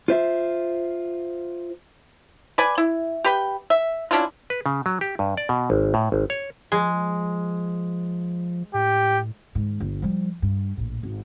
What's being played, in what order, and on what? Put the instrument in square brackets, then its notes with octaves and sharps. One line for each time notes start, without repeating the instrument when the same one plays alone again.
[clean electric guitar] F4 C5 E5
[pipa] B4 D5 G#5
E4
G4 B4 G5
E5
C#4 D4 E4 F4
[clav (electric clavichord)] B4
C#3
F#3
G4
G2
D5
B2
G#1
A2
G#1
C#5
[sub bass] F3 [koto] G#3
[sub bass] A2 [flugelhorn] G4
[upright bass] G#2 D#3
G1
F3 G3
G2
A#1 A2
G#1